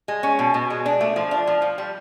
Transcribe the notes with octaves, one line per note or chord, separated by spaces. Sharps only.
G#3
C#4
B2
B2
G#3
D4
A3
F3
D4
F3
F3
G3